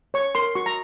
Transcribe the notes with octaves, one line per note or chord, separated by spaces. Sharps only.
C#5 C#6
A#4 C6
F#4 C#6
A#5